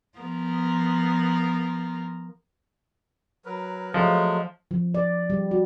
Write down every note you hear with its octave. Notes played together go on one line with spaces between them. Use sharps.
F3 B3 A#4
F#3 A#4 B4
F3 F#3 G#3 A3
F3
D5
G3
F#4